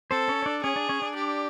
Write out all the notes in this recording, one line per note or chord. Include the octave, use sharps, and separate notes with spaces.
C4 A4 C5
C#4 C#5
C#5
D4 D5
C#4 G#4 C#5
D4 D5
C#4 C#5
D4 D5
G4